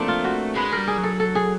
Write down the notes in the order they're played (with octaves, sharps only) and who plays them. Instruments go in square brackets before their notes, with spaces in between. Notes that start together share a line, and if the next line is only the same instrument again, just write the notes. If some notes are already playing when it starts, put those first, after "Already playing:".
Already playing: [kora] F3 A#3 C4 D4 [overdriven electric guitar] A3
[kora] F4
F#4
[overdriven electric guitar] G#3 [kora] B4
[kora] A#4
[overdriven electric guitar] G3
[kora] G#4
[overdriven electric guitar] F#3
[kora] A4
A4
G#4